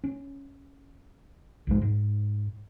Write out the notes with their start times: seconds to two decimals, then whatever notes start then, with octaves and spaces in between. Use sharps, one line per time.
0.04 C#4
1.67 A#1 G#2 G#3
1.82 G#2